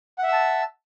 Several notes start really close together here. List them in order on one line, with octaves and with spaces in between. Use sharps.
F#5 E5 E6 A5